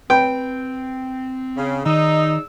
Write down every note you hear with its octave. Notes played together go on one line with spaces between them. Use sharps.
C4 B4 G5 B5
C#3
D#3 D#4 G#4 D5 E6